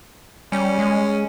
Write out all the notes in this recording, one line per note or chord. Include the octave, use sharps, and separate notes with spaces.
G3 C#4
G#3